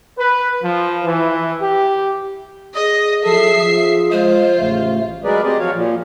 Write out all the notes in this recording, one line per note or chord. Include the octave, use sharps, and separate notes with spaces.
B4
F3
E3
G4
G#4 D#5 D#6
F3 F#3 A4 E5 C7
F3
G#3 F4 C5
A1 C#3 A3
F#3 G#3 G#4 A#4 B4 D5
C4 G4 G#4 D5 D#5
F3 F#3 F#4 C#5 F5
A#2 F3